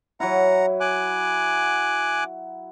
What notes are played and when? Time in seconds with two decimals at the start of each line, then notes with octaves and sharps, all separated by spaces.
0.20 F#3 E4 F#5 A#5
0.80 G#5 D6 F#6